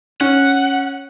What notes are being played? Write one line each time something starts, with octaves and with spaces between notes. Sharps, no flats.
C#4 F#5